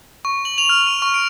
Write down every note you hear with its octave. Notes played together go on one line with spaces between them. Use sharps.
C#6
F#7
F7
F6
D#7
C#6
D7